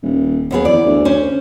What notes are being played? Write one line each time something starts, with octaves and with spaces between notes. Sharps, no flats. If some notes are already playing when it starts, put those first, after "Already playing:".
D#1
D#2 B3 G#4
E2 D5
D2
C#4 C5